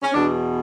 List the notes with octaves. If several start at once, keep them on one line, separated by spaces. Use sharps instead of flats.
C#4
E2 B2 D4